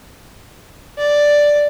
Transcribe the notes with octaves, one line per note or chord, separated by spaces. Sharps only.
D5